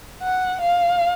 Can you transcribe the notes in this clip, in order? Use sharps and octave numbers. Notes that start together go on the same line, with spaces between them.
F#5
F5